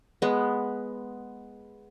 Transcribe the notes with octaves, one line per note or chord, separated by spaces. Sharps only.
G#3 B3